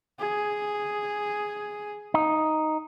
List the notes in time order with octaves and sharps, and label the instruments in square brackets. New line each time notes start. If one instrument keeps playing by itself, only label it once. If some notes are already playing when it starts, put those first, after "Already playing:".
[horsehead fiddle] G#4
[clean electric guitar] D#4